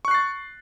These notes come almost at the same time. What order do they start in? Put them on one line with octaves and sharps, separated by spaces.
C#6 F#6 C7 A6